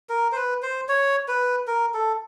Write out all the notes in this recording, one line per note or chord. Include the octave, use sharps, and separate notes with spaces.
A#4
C5
B4
C5
C#5
B4
A#4
A4